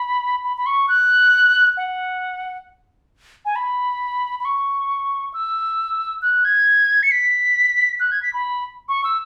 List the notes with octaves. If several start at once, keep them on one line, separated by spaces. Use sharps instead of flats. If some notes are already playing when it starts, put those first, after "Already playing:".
Already playing: B5
B5
B5
C#6
F#6
F#5
G#5
B5
B5
C#6
E6
F#6
G#6
C#7
B6
F#6
G#6
B6
B5
C#6
E6